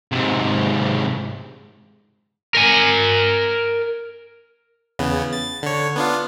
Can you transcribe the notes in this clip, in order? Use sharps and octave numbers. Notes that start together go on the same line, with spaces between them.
G#2 C3
A#4 G#5
E2 C#3 B3
A6
D3 C#5
B3 D4 F4